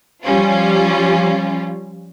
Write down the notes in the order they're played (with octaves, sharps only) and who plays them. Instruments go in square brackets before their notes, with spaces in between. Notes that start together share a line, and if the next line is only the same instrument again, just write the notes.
[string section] F3 G3 C#4 F4